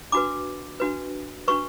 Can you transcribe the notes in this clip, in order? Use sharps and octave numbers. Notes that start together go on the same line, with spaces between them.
D4 F#4 B4 D6
D4 F#4 B4
D4 F#4 B4 C#6